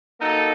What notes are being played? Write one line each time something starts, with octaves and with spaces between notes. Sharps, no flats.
F#3 A#3 D#4 A4